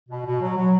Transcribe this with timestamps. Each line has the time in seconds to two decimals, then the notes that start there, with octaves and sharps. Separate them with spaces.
0.09 B2
0.26 B2
0.41 F#3
0.57 F#3